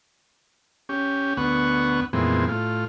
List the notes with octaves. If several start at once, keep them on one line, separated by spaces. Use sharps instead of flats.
C#4 G4
D2 B3 F#5 C#6
F2 A#2 E3 G#3 B3 C4
A2 F4